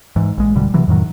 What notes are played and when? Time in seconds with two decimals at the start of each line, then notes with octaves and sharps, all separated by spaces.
0.16 G#2 E3
0.38 A#1 G#3
0.55 F1 B2 D3 G3
0.74 C3 E3 F#3
0.87 F2 A2 D#3 F#3